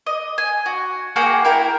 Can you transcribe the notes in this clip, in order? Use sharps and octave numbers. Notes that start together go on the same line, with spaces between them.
D#5
G#5
F#4
A#3 F#4 G#4 G5
E4 A#4 G5